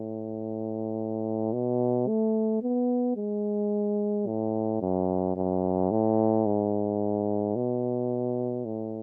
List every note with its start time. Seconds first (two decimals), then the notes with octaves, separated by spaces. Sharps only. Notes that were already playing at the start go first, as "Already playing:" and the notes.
Already playing: A2
1.53 B2
2.08 A3
2.62 B3
3.17 G#3
4.27 A2
4.81 F#2
5.36 F#2
5.91 A2
6.46 G#2
7.56 B2
8.65 A2